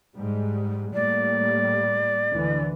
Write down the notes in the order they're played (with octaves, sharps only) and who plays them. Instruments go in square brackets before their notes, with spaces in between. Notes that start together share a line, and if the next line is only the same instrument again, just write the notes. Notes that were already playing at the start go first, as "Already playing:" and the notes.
[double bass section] G#2 G3 G#3
[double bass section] A2 G3 A#3 [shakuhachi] D5
[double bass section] D2 D3 E3